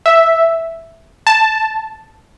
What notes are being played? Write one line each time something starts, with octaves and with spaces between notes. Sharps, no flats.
E5
A5